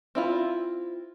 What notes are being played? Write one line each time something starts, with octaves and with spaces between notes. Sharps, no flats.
C4 E4 F4